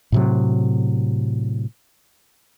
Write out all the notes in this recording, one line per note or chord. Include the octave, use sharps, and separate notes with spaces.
A2 C3 F#3